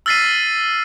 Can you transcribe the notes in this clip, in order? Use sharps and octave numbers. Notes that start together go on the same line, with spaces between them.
E6 F6 A6 B6 C7 D#7